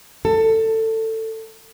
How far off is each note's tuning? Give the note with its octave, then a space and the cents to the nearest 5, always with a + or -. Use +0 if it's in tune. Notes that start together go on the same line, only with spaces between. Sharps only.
A4 +20